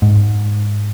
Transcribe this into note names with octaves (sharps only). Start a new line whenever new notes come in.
G#2